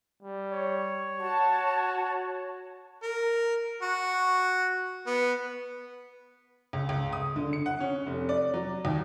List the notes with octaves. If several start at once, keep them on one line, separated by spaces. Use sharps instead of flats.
G3
C#5
F#4 A5
A#4
F#4
B3
C#2
C#2
D#6
D3
C#7
F#5
C#4
F1
D5
F#3
D#2